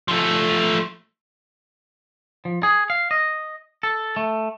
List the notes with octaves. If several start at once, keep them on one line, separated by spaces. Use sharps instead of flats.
F3 A3
F3
G#4
F5
D#5
A4
A3